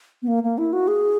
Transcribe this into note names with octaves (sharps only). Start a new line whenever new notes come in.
B3
A#3
A#3
E4
F#4
G#4